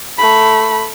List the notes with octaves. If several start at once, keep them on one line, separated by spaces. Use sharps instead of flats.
A3 B5